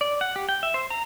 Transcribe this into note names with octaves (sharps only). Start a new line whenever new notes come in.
D5
F#5
G4
G5
E5
C5
A#5